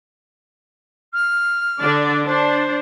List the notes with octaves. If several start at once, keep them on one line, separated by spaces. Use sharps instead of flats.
F6
D3 D4 D5
D4 C5